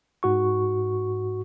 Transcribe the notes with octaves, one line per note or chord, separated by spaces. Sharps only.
G#2 F#4 C#6